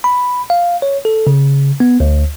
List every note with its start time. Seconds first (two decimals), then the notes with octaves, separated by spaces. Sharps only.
0.04 B5
0.50 F5
0.82 C#5
1.05 A4
1.27 C#3
1.80 B3
2.00 D2